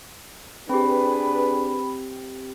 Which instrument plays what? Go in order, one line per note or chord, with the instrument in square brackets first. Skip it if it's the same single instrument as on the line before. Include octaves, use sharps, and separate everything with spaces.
[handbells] C4 G4 [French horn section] D4 G#4 B4 [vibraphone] B5